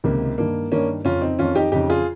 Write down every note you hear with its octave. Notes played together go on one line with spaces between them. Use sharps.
C#2 C3 D#3 A#3
G2 D#3 A#3
G2 D#3 A#3 C#4
F2 C#3 C#4 F4
C4 D#4
F2 D#3 C#4 F4
D#4 G4
F2 C#3 D#4 G4
F4 G#4